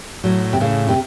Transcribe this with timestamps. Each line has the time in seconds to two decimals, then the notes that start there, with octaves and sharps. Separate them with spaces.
0.24 A2 F#3
0.53 C3
0.60 A2 C#3
0.89 C3